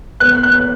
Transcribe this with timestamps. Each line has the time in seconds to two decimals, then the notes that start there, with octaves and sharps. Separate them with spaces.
0.20 B3 F#6
0.43 F#6